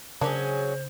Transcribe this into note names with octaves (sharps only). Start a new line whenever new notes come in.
C#3 F#3 A#3 C#4 D4 G#4 C5